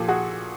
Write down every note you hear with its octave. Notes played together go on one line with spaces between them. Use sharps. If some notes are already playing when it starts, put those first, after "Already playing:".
Already playing: A#2 F3 G4 A4
F#4 G#4